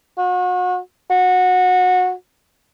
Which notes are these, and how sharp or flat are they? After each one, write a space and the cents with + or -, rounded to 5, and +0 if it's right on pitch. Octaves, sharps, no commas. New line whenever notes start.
F#4 -35
F#4 -20